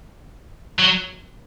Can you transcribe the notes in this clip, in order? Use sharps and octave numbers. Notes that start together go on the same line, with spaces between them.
F#3